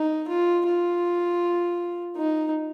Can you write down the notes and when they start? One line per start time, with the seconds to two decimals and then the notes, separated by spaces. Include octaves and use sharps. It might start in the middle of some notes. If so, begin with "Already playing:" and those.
Already playing: D#4
0.28 F4
0.67 F4
2.17 D#4